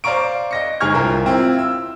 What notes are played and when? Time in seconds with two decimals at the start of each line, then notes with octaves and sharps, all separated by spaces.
0.04 C5 D5 F5 A#5 C#6 D7
0.51 D#5 A#6 C#7
0.80 G1 G#2 G#4 C#6 F6 G#6
0.94 C2 F4 A#4 A#5
1.26 C4 E4 F4
1.59 E6